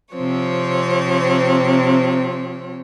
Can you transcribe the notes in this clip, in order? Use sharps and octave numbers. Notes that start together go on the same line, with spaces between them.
C3 F3 C4 C#5